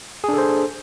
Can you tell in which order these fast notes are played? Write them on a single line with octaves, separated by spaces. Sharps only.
G#4 D4 A4 C5